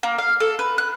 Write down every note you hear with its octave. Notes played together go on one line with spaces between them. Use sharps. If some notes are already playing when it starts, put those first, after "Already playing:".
A#3
F5
A4
B4
F#6